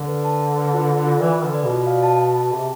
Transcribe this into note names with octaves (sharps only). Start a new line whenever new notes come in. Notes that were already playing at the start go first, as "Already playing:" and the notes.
Already playing: D3
B4
A5
A5
B4
F4
F4
F4
E3 D5
D3 B4
D5
B2
F4
F5
A5
A5
A5
C3 G#4